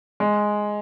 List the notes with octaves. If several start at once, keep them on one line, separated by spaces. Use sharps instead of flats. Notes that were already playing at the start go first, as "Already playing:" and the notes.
G#3